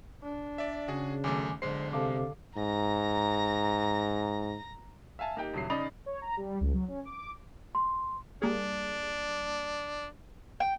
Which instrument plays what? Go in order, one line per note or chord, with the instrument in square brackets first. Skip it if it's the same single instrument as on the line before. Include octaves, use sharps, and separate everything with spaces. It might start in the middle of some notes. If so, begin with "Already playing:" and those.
[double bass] D4
[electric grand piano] D5 E5
[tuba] C#3 [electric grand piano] F#4 G#4
[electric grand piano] B1 F#2 A3 [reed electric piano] D#3 G#5 D6
[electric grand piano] B1 G#3 C7 [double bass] D3 [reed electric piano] C5
[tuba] C3 [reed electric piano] A4 F5 D6
[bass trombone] G#2 [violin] A#5 A#6
[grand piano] E5 F5 G#5 A5
A#3 D#4 G4 G5
D#1 C#2 F#3 E4 C7
C#3 D#4 D5 D#5 B5 F7
[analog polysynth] C#5
A#5
G3
C#2
F#3
C#4
D6
[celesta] C6
[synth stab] G3 A#3 G#4 [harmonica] D4
[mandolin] G5